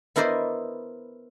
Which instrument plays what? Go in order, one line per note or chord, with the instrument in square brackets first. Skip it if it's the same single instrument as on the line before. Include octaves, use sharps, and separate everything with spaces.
[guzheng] B3 E4 A#4 C5 D5 D#5